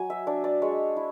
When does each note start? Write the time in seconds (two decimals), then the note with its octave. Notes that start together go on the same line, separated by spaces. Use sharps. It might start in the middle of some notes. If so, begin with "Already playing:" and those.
Already playing: F#3 G#5
0.10 E5
0.27 D4 D5
0.44 D5
0.62 G#3 C#5
0.97 E4